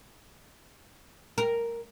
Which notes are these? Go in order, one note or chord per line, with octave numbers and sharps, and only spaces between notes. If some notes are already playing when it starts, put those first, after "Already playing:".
A#4